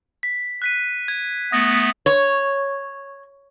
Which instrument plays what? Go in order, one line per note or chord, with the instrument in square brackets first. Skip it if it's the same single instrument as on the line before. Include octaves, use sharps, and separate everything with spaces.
[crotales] B6
F#6 B6 D#7
G#6
[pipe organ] A3 B3 [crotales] D#6 A#6
[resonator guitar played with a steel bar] C#5